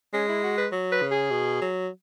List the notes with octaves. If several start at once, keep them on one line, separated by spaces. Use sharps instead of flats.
G#3 C#4
E4
F#4
B4
F#3
B4
C#3
G#4
B2
F#3